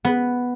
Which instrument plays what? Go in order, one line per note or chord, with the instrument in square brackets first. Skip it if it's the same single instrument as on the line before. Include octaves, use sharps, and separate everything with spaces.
[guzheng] B3